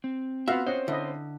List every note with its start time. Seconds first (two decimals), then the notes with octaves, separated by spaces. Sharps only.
0.04 C4
0.48 B3 F4 F#4 E5 F5
0.67 C4 C#4 C5 D#5 F#5
0.88 D3 E4 D#5